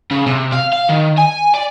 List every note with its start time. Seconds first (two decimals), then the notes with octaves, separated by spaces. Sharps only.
0.11 C#3
0.27 C3
0.52 F5
0.73 F5
0.89 D#3
1.18 G#5
1.54 D5